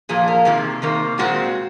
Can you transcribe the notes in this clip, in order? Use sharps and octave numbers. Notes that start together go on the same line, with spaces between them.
A#2 F3 A#3 G#4
A#4
C3 D#3 A#3 G#4
C3 D#3 A#3
A#2 G#3 C4 F#4